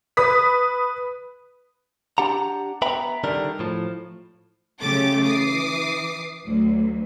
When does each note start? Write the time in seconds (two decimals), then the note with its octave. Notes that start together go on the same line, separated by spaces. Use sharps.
0.17 B4 D#6 B6
2.18 D4 G4 F#5 A#5
2.82 B3 B4 E5 G5 A#5 B5
3.24 D3 D#3 G3 D4 A#4
3.59 A2 F3
4.80 C#3 F#3 A3 G4 D6 A6
5.23 E3 D6 D#6 C7
6.43 D2 F#3